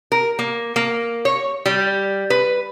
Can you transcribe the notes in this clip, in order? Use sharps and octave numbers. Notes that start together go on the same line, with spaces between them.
A#4
A#3
A#3
C#5
G3
B4